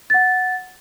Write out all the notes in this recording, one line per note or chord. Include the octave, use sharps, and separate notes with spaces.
F#5 A6